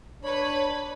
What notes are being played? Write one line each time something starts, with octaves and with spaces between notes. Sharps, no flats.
D4 B4 C#5 B5